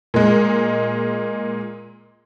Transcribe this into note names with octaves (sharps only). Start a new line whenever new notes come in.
A#2 G#3